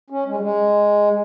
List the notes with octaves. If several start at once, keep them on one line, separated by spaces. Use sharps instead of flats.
C#4
G#3
G3
G#3